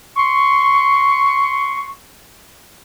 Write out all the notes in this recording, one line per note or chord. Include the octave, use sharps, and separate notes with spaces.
C6 C#6